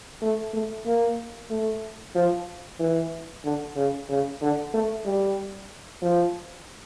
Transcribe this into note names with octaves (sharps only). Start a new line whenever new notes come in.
A3
A3
A#3
A3
F3
E3
D3
C#3
C#3
D3
A3
G3
F3